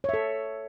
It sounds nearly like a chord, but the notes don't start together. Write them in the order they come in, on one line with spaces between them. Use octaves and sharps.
C#5 E5 A4